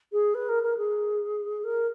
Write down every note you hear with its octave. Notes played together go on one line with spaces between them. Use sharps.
G#4
B4
A#4
A#4
G#4
A#4